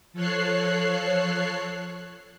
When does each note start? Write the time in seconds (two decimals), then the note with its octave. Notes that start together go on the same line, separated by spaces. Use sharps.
0.13 F3 A4 C#5 F#6 C7